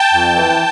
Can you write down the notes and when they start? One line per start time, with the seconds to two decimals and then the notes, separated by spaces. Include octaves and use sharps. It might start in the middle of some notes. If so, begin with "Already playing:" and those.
Already playing: G5 A5
0.13 F2
0.36 E3